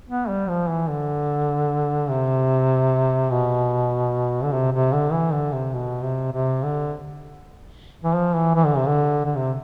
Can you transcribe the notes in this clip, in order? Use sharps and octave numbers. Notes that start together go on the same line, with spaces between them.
B3
G3
F3
E3
D3
C3
B2
D3
C3
C3
D3
E3
D3
C3
B2
C3
C3
D3
E3
F3
E3
E3
D3
C3
D3
D3
C3